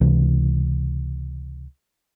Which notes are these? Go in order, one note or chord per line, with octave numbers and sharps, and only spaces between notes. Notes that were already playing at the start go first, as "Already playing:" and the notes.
C#2 C3 E3